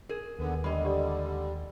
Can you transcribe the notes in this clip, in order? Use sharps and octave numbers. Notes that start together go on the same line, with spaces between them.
G#4 A#4
D#2 D3 B3
D3 G3 G#3 D#5 B5
G4 D5